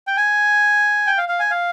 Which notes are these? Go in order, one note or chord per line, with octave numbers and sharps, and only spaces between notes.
G5
G#5
G5
F5
F5
G#5
F5